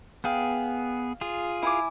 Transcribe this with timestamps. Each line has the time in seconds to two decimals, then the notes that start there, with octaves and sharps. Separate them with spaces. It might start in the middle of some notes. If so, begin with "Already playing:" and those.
0.24 B3 G#4 F5 G5
1.21 F4 G#4
1.63 E4 G#5 D6